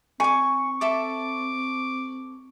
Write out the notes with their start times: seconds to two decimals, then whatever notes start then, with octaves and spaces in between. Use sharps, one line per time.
0.20 C4 G#5 C#6 D6
0.81 A4 E5 A5 D6